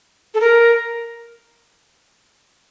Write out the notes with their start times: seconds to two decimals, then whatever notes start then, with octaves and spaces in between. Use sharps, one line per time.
0.34 A4
0.40 A#4